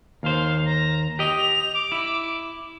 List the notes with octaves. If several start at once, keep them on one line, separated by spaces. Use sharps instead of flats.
D#2 C5 F5
A#5
G4 D#5 F7
D6
E4